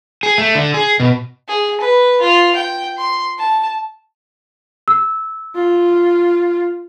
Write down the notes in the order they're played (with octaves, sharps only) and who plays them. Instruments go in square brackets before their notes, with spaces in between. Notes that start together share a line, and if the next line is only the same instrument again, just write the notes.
[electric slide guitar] G#4
A3
D3
G#4
B2
[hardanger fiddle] G#4
B4
F4
G5
C6
A5
[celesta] E6
[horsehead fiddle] F4